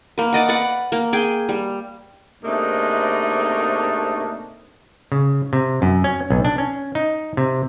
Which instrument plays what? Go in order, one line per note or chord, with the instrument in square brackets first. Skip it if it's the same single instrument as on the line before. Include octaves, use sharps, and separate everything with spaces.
[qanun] A#3 B4
D5 D#5 F#5
B4 D5 F#5
A#3
G#4 G5
G3
[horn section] G#2 C3 A3 A#3 D4 D#4
[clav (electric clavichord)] C#3
C3
F#2
C#4
B1
D4
C#4
D#4
C3